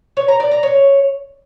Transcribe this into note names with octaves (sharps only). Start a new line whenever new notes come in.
C#5
A#5
D5
A#5
C#5